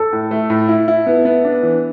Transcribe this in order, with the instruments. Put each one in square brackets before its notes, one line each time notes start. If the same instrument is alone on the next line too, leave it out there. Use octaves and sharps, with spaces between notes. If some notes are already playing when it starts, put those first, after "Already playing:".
Already playing: [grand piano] A4
[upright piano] A2
A3
A2
E4
E4
B3
B3
D4
E3